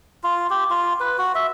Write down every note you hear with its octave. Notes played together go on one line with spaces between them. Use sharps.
F4
G4
F4
B4
F#4
E5